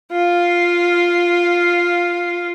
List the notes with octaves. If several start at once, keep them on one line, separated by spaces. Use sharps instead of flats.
F4 F5